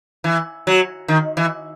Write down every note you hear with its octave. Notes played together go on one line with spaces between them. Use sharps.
E3
F#3
D#3
E3